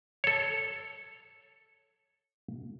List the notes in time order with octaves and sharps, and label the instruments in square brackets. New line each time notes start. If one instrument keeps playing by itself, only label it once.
[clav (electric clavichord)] A4 C#5